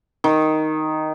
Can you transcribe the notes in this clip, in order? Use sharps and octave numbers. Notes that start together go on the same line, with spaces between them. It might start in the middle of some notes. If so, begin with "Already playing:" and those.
D#3